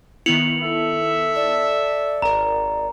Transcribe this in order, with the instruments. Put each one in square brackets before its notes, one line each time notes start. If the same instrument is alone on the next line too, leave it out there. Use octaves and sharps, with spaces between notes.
[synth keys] D#3 B3 E4 [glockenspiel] C#7 F7 F#7
[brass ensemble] A4 E5
[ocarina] D5
[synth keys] G#1 A#4 [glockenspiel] A#5